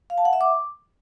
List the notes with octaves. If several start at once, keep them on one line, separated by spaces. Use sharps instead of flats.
F5
A5
F#5
E5
D6